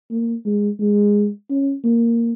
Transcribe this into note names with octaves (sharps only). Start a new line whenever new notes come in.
A#3
G#3
G#3
C#4
A#3